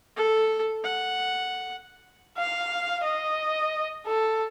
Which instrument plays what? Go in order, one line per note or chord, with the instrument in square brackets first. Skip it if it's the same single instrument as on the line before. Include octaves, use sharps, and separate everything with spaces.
[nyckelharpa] A4
F#5
[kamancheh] F5
D#5
A4